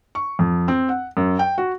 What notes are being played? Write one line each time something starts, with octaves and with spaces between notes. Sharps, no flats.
C#6
F2
C4
F#5
F#2
G5
F#4